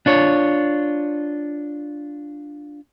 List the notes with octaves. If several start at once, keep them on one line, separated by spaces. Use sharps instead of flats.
D4 F4 C#5